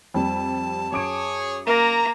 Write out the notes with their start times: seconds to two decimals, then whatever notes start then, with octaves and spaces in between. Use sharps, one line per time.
0.14 F2 G3 A5
0.92 F#2 G#4 C#5 D6 D7
1.67 A#3 A#4 A#5